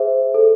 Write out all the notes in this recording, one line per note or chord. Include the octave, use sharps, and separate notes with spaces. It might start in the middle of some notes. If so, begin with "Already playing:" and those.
Already playing: G#4 C5 E5
A4